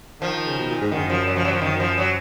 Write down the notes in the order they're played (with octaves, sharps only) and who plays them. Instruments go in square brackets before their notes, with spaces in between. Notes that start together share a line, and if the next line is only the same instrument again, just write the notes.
[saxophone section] D#3 [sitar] F3
[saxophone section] C#3
B2
A#2
G#2
[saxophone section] F#2 [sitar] D#3
[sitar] F3
F#3
F3
F#3
F3
[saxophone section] F#2 [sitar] D#3
[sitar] F3
F#3